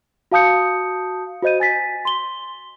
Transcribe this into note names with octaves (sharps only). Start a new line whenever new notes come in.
F#4 F5 A5 D#6 G6 C#7
F#4 C5 D#5 G6 D#7
G#5 A6 B6
C6 G7